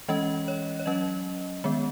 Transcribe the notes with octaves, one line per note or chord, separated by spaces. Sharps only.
E3 G#3 C#4 D#5
C#5
C#5
F#3 C#4 D#5
D#3 G#3 B3